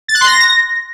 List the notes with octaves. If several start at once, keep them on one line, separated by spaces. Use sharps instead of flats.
A6
F#6
C6
A#6